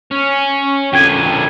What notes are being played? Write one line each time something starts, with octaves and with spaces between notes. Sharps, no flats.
C#4
F2 D3 G5 G#6 D#7